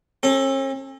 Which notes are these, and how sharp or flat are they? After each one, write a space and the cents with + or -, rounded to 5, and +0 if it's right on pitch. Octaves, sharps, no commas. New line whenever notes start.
C#4 -45 A4 +0